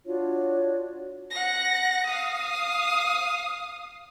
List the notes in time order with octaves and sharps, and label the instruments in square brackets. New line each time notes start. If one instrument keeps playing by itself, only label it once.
[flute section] D4 F4 F#4 C#5
[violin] F#5 A#6
F5 D#6